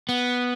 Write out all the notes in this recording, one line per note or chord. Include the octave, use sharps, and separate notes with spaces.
B3